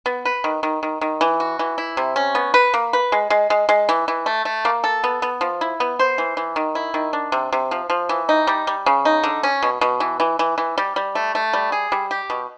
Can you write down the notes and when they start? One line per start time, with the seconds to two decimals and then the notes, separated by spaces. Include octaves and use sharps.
0.06 B3
0.25 B4
0.44 D#3
0.63 D#3
0.83 D#3
1.01 D#3
1.21 E3
1.40 F#4
1.59 E3
1.78 E4
1.97 C3
2.16 C#4
2.35 B3
2.54 B4
2.74 A#3
2.93 B4
3.12 G#3
3.30 G#3
3.50 G#3
3.69 G#3
3.89 E3
4.08 E3
4.26 A3
4.45 A3
4.65 A#3
4.84 A4
5.04 B3
5.22 B3
5.41 F3
5.61 E4
5.80 B3
5.99 C5
6.18 E3
6.37 E3
6.56 D#3
6.75 E4
6.94 D#3
7.13 D4
7.32 C3
7.52 C3
7.71 F3
7.90 F3
8.09 E3
8.29 D#4
8.47 G3
8.67 G3
8.86 C#3
9.05 D#4
9.23 D3
9.43 C#4
9.63 B2
9.81 B2
10.00 E3
10.20 E3
10.39 E3
10.58 E3
10.78 G3
10.96 G3
11.15 A3
11.35 A3
11.53 G3
11.72 G#4
11.92 G3
12.11 G4
12.30 B2